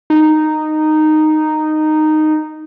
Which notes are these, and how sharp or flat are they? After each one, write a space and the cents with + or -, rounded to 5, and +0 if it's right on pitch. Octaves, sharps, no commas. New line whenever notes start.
D#4 -10